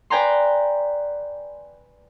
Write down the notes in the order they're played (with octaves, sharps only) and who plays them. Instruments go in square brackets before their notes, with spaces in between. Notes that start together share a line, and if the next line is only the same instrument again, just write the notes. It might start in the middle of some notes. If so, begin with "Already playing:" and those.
[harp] B4 D5 G5 G#5 A#5 C6